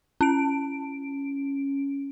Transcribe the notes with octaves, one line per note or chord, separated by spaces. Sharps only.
C#4 D7